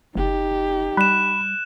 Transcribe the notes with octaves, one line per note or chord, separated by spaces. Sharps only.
F#1 D#4 G4
G3 B5 F#6 E7